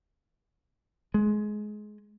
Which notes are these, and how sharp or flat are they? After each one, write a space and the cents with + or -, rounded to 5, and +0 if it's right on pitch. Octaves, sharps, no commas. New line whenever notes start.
G#3 +20